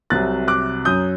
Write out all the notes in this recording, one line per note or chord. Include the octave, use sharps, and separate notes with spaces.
C2 C3 F#3 F#6 A6
D6 F#6
F#2 F#3 D#6 G6